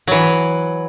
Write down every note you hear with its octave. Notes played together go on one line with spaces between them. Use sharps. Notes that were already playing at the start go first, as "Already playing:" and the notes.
E3 F#3